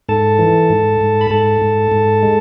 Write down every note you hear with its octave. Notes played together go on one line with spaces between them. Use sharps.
G#2 A4 A5
E3
G#2
G#2
B5
G#2 A4 A5
G#2
G#2
G#3